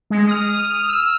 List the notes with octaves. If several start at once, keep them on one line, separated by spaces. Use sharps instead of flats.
G#3
D#6 F6
E6 F6